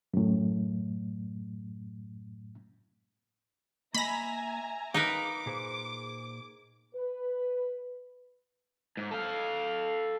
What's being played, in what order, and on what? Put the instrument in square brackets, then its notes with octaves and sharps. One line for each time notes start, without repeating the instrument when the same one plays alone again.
[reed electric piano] F#2 A2
[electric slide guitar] A#3 D#5 [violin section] E5 G#5 A#5 [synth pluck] B5 A#6
[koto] D#4 A#4 B4 [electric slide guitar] F5 [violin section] D6
[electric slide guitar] A#2 G#4 C5
[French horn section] B4
[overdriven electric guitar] G#2
A4 F5